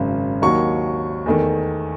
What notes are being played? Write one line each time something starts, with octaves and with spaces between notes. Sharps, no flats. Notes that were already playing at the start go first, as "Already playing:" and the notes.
Already playing: G#1 F#2 C#3
D#2 D#3 F#3 C#6
E2 D#3 A3